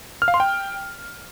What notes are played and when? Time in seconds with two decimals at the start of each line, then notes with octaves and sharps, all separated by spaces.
0.22 F6
0.28 F5
0.34 C6
0.40 G5